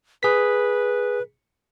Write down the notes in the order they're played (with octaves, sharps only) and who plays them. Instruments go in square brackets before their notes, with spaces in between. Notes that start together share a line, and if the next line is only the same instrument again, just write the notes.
[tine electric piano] G#4 B6 [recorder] B4